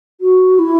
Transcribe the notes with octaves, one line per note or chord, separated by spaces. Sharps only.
F#4
E4